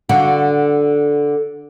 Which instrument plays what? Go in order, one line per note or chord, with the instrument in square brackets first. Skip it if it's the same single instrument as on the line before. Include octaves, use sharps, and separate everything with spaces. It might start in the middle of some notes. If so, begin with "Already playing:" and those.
[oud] D3 F#4